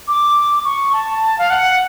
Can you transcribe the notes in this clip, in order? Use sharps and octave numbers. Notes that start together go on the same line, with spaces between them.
D6
C#6
A5
F5
F#5